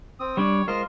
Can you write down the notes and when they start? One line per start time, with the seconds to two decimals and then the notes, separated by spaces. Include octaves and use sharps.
0.20 C4 D#6
0.37 G3 D4 C#5 D5
0.68 G#3 F4 A#4 C5 D#5 F6